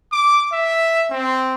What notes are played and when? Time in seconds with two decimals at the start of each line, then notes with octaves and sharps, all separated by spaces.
0.12 D6
0.52 E5
1.10 C4